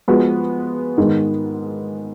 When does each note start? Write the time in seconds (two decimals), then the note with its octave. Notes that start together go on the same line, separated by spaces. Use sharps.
0.08 F3 G#3 B3 F#4
0.97 G#2 D#3 G#3 B3